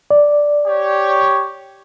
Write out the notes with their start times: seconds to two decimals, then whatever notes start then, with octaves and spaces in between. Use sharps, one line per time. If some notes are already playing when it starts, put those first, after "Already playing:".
0.11 D5
0.66 G4 C#5